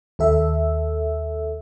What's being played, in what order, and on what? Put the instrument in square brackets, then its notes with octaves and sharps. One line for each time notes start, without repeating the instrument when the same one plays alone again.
[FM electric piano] D#2 A4 E5